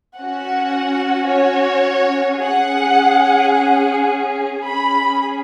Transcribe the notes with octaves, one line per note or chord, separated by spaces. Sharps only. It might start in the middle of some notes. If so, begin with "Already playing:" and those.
C#4 F#4 F#5
C#5
C#4 G#4 F#5
F#5
C#4 G#4 B5